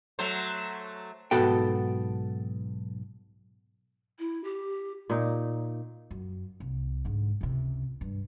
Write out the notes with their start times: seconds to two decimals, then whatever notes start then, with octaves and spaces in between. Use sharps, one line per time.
0.19 F#3 A3 C5
1.31 B1 G#2 B3 F#4 A4 G5
4.19 E4
4.44 G4
5.10 A#2 D#4
6.11 F#2
6.60 C2
7.05 G#2 D3
7.41 C#2 C3
8.01 G2